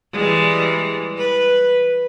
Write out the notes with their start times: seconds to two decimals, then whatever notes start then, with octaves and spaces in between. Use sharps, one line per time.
0.13 E3 G3 G#3
1.18 B4